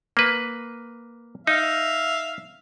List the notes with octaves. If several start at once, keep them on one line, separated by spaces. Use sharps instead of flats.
A#3 B4
D#4 E5 F5